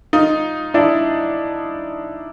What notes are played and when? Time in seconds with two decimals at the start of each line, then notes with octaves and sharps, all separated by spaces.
0.13 D#4 F4
0.74 D4 E4